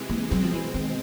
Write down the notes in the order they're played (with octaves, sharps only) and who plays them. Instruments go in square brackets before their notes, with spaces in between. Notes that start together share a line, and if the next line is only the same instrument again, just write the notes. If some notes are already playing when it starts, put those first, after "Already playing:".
Already playing: [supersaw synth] C3 E3 G#3
[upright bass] A#3
[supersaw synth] B2 G#3 C4 [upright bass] F#3
[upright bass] F3
E3
D#3